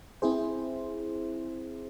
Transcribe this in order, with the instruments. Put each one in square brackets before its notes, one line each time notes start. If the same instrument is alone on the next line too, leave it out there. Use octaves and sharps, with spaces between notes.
[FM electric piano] C4 E4 G#4 C5